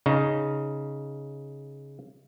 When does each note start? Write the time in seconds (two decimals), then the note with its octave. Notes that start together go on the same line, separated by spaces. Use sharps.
0.06 C#3 D#4